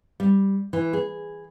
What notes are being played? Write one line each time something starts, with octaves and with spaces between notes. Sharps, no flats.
G3
E3
G#4